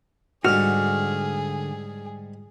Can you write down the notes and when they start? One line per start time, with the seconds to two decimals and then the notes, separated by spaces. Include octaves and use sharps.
0.45 G#2 D3 G3 F#4 G#4 F6